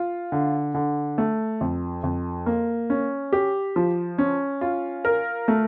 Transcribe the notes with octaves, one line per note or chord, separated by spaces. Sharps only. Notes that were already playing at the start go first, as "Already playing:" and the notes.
Already playing: F4
D3
D3
A3
F2
F2
A#3
C#4
G4
F3
C#4
F4
A#4
A3